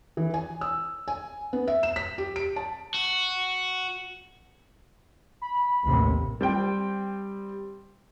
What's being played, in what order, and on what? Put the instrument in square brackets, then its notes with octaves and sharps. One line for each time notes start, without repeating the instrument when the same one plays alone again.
[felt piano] E3
G#5
E6
G#5
B3
E5
E7
B6
G4
D7
A5
[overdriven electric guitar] F#4
[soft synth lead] B5
[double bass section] A1 D#2 C3
[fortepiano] G3 C4 G5